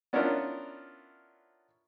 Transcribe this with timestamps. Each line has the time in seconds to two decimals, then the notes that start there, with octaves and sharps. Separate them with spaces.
0.13 B3 C#4 D4 E4 F4 A#4